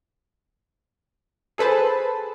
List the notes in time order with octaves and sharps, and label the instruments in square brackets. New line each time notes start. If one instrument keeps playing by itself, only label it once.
[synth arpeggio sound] G#4 A4 B4 C5 A5